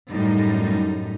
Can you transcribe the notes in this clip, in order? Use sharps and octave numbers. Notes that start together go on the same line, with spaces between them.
F#2 A2 G3 D#4